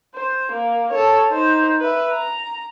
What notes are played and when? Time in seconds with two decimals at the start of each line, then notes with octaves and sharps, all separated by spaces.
0.14 C5
0.52 A#3
0.91 A4 C#5
1.31 D#4 C5
1.80 B4 E5
2.13 A#5